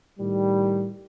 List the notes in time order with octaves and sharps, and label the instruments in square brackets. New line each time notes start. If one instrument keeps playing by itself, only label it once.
[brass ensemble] A2 D#3 G3